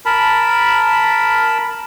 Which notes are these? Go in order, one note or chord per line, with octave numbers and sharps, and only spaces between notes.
A#4 A5 B5